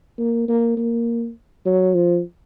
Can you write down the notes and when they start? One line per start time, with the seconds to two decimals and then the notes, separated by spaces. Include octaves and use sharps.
0.18 A#3
0.48 A#3
0.77 A#3
1.65 F#3
1.94 F3